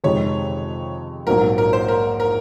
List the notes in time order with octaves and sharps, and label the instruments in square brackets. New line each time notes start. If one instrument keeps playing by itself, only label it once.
[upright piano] F2 C3 D#3 G#3 [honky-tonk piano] C#5
[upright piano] A#1 G#2 F#3 A#3 [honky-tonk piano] A#4
[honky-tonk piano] A#4
C5
A#4
A#4